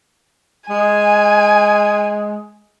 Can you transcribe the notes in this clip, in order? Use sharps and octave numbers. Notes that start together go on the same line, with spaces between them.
G#3 G#5